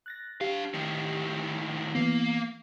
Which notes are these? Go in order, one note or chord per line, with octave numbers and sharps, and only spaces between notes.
F#6 A6 A#6
D4 G4 F5
A2 D#3
E3 A#3 B3